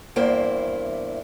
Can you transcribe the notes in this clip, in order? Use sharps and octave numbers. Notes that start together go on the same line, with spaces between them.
E2 G2 A#3 E4 C5